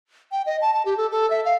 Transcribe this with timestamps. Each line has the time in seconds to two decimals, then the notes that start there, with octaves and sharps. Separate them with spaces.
0.32 G5
0.46 D#5
0.61 A5
0.74 A5
0.85 G4
0.97 A4
1.11 A4
1.30 E5
1.45 F5